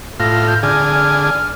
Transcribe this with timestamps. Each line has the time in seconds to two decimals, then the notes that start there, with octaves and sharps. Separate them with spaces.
0.20 A2 F4 A#6
0.47 G6
0.63 D3 G#4 F6